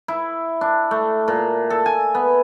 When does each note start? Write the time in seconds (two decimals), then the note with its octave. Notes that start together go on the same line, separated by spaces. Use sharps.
0.08 E4
0.61 D4
0.91 A3
1.28 A#2
1.70 A4
1.86 G#5
2.15 B3